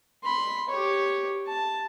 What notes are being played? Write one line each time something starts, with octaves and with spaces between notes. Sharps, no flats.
B5 C6
G4 C#5
A5